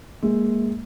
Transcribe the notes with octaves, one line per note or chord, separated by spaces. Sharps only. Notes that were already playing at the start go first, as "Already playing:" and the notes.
G#3 A#3